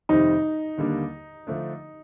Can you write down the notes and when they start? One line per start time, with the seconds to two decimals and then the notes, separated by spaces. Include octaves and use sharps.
0.09 F2 C3 D#3 G3 C4 D#4
0.78 D#2 D3 G3 A#3 D4
1.47 D3 F3 A3 D4